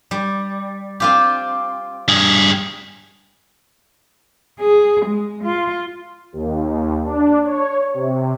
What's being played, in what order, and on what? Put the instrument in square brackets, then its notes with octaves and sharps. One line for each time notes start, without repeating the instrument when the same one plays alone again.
[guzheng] G3
C4 F4 G4
[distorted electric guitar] G2 G#4
[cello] G#4
G#3
F4
[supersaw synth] D#2
D4
C#5
C3